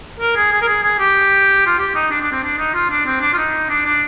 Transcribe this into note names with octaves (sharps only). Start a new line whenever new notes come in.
A#4
G#4
G#4
A#4
G#4
G#4
G4
F4
G4
D#4
D4
D4
C4
D4
D#4
F4
D4
C4
D4
F4
D#4
D4
D4